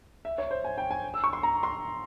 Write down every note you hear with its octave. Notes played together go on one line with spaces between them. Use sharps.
E5
C#5
C5
G#5
G5
G#5
E6
C#6
C6
A#5
C6